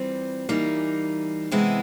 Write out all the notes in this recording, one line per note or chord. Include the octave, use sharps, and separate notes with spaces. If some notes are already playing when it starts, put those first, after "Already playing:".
Already playing: E3 G3 C4 F4
E3 G3 A#3 D#4
C3 E3 G#3 B3 E4